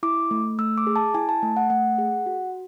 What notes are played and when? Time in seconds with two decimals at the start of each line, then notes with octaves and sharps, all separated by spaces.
0.03 E4 D6
0.31 A3
0.59 A3 E6
0.78 D6
0.87 G#4
0.96 A5
1.14 E4 G#5
1.29 A5
1.42 A3
1.57 F#5
1.70 A3 F#5
1.98 G#4
2.26 F#4